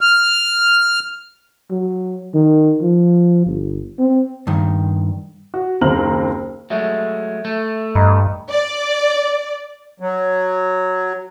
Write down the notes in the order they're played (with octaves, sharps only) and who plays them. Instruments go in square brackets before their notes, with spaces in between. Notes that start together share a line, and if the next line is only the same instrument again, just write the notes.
[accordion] F6
[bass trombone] F#3
D#3
F3
G1
C4
[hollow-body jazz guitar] G2 D#3
[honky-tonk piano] F#4
F#1 D#2 C4 A#5 F6 F#7
[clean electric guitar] F#3 G#3 A3 [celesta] E5
[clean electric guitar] A3
[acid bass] G2 [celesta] D#5 A#5 B5
[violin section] D5
[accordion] F#3